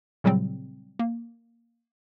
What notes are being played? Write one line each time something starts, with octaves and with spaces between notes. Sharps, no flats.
A#2 C#3 F#3 G3 C4
A#3